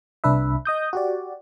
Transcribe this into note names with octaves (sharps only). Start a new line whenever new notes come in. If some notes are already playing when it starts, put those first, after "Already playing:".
C2 D4 B4 E5
D#5 D#6 G6
F#4 G4 D5